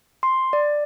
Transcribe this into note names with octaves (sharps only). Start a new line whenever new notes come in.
C6
D5